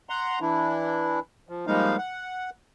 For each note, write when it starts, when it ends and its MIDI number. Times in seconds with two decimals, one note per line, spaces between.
0.09 0.39 78
0.09 0.39 82
0.09 0.39 84
0.41 1.20 52
0.41 1.20 62
0.41 1.20 64
1.49 1.66 53
1.67 1.97 53
1.67 1.97 55
1.67 1.97 56
1.67 1.97 58
1.67 1.97 63
1.67 1.97 77
1.98 2.50 78